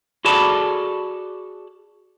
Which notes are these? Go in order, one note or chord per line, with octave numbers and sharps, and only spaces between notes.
F#4 G#4 A4 D5 A5 B5